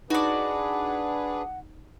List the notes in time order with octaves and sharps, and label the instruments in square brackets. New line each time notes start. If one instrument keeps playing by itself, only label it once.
[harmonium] D4 G#4 B4 [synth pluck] D#4 [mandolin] F#4 D5 [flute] F#5